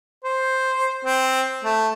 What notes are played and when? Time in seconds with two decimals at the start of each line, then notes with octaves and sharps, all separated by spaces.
0.24 C5
1.05 C4
1.64 A3